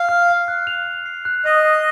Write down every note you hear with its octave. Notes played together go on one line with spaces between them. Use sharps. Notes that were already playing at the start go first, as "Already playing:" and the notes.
Already playing: F5
F6
C7
F#6
F7
F#6
C7
F#6
D#5 D#6
C7